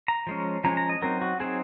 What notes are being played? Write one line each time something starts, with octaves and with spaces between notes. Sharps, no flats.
A#5
F3 G#3 C#4
F3 G#3 C#4 A#5
A#5
D#5
F#3 C4 D#4 A#4
F#4
F#3 C4 D#4 G#4